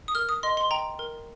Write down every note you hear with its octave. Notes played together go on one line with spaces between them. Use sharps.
D#6
A#4 F6
D#6
D#5 C6
C6
G5 A#5
A#4